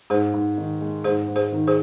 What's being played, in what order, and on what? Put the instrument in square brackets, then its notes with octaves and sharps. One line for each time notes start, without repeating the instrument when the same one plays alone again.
[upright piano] G#2 [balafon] G#4 C5
[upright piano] G#2
D#3
G#3
[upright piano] G#2 [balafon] G#4 C5
[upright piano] G#2
[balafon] G#4 C5
[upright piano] D#3
[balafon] G#4 C5